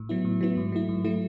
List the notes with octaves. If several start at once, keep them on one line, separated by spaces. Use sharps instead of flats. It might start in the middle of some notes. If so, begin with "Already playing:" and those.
Already playing: A2
F#3 B3 E4
A2
F#3 B3 E4
G#2
F#3 A3 E4
G#2
F#3 A3 E4